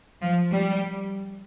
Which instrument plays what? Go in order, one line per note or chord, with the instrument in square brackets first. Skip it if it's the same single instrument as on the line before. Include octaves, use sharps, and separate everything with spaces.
[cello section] F3
G3